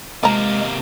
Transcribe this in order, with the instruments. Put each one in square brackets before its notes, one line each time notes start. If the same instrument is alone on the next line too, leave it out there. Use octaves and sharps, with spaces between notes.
[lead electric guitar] C3 A#3 [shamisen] F3 A#5 [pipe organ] G#3